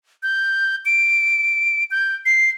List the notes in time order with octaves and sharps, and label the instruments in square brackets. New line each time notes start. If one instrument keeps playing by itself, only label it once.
[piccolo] G6
D7
G6
C7